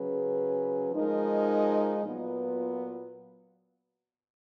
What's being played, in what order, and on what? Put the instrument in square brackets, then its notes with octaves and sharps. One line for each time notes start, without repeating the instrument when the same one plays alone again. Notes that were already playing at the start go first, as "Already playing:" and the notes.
Already playing: [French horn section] C#3 F#3 C#4 G#4 B4
F3 G#3 D#4 A#4
A#2 F#3 B3 F4 B4